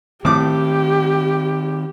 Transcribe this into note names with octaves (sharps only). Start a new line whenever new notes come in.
A2 D#3 C4 G4 D6